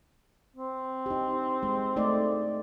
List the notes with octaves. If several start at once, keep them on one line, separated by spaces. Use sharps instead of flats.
C4
D#4 G4
G#3
A3 D#4 D5